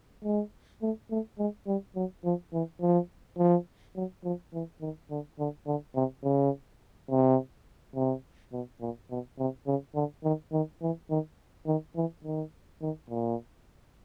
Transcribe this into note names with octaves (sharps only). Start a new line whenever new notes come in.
G#3
A3
A3
G#3
G3
F#3
F3
E3
F3
F3
F#3
F3
E3
D#3
D3
D3
D3
C3
C#3
C3
C3
B2
A#2
B2
C3
C#3
D3
D#3
D#3
E3
D#3
D#3
E3
D#3
D#3
A#2